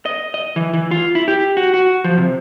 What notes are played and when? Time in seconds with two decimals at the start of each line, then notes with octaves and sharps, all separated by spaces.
0.05 D#5
0.34 D#5
0.56 E3
0.73 E3
0.91 F4
1.15 E4
1.28 G4
1.57 F#4
1.74 F#4
2.04 F3
2.18 C3